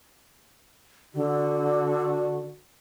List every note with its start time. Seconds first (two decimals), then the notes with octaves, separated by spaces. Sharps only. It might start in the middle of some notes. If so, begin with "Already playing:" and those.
1.15 D3 D4 F#4